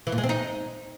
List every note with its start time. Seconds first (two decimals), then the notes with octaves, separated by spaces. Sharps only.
0.07 E3
0.12 A#2
0.18 G#3
0.24 C4
0.29 D#4